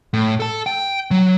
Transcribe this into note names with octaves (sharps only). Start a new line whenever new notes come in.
A2
A4 A5
G5
F#3